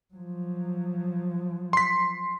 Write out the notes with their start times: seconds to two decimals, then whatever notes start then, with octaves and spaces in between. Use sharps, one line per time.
0.14 F3 F#3
1.73 C6 B6